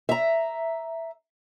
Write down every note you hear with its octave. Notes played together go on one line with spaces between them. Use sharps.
E5 A#5